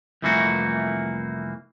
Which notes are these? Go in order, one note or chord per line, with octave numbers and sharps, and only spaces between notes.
C2 F2 E3 A3 A#3 F#4